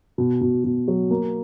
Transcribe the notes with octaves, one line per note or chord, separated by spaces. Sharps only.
B2
B2
B2
F#3
A#3